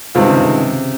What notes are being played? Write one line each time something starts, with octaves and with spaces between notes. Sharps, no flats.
G2 C3 D#3 G#3 C4 F4
C#3
C3